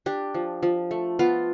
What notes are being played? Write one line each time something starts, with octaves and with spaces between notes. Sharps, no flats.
D4 G4
F3
F3
A3
B3 F4